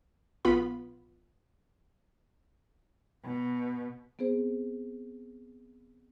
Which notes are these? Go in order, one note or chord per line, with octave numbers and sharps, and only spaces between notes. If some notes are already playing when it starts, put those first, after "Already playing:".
A#1 B3 F4 B5
B2
B3 C4 G#4 C5